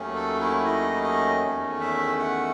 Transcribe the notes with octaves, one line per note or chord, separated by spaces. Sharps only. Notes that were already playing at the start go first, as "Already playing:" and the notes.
Already playing: D#2 D#3 F#3 A3 C#4
A4
E4
D#5
D#5
E2 D#3 A3 C#4
E5
F#5